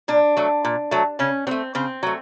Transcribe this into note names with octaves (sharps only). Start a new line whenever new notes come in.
A#2 D4
F#3 A3
A#2
F#3 A3
C#3 C#4
F#3 A3 C4
C#3 C4
F#3 A3